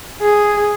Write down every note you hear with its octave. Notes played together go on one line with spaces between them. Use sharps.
G#4